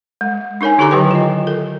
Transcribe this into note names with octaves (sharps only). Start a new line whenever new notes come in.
G#3
D4 D#4 A#4 C#5 G#5
D3 E4 G4 A4 A#5 D6
D#3 F#3 G4 B4 C#5 G5
F4 D#5
A4 A#4